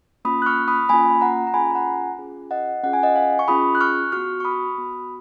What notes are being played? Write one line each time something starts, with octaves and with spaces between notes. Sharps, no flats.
A#3 C#4 F4 B5 D#6
F#6
C#6 F6
B5 D#6
A#3 C#4 F4 G#5 B5
F#5 A#5
A#5
C#4 F4 G#4 G#5 B5
G#5
F#5 A#5
C#4 F4 G#4
D#5 F#5
C#4 F4 G#4 F#5
G#5
D#5 F#5
F5 G#5
C#6
C#4 F4 G#4 B5 D#6
F#6
C#6 F6
B3 F#4 C#6 F6
C#6
B5 D#6
B3 F#4